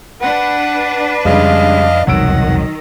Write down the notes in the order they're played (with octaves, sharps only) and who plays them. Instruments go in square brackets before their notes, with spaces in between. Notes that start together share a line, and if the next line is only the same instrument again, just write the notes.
[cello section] D4 B4 [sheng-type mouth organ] F#5
[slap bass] F2 [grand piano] C#3 G3 G#3 [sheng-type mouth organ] D#5 F5
[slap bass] E1 C2 F2 [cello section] D#3 [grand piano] F#3 E6 D7 [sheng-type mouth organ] F#5